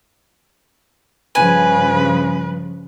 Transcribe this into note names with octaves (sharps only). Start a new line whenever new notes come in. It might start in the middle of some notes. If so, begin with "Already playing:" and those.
G2 C#3 F3 B4 G#5